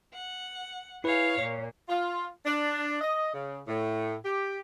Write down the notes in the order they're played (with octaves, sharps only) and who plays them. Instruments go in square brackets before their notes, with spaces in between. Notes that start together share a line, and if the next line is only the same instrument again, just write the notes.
[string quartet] F#5
[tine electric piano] E4 B4 [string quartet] G#4 C#5 F5
[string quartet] A#2 [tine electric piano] C#5
[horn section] F4
D4
D#5
C#3
A2
G4